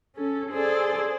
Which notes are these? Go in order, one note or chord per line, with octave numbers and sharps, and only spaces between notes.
C#4 A4
G#4 A4 C5 D5